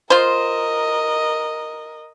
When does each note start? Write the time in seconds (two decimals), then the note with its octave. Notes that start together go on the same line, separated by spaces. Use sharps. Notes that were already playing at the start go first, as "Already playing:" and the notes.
0.10 F4 A#4 C5 D#5